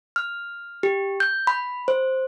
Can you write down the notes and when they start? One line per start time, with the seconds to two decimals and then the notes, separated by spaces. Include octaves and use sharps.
0.16 F6
0.83 G4
1.20 G6
1.47 B5
1.88 C5